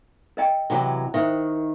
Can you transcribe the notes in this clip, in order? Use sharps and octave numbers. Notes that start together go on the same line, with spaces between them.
A#4 D#5 G5
C3 E3 F#3
D#3 C5 E5